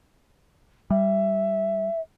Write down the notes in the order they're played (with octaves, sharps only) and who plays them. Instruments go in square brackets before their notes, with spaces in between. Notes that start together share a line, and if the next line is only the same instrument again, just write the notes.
[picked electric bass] G3 [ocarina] E5